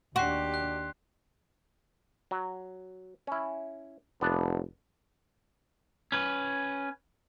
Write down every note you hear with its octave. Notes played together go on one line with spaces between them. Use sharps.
D#2 D4 F#4 G4 C6 F#6 C7
F#6
F#3
C#4 E4
F1 B3 D4
C#4 B4